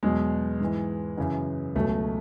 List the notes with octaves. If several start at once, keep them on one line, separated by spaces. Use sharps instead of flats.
E2 B2 F#3 G#3
G#2 E3
F#2 C#3 E3
C#2 B2 F#3 A3